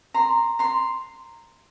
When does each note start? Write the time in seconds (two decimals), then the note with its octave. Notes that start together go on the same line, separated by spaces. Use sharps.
0.14 A#5 C6
0.59 A#5 C6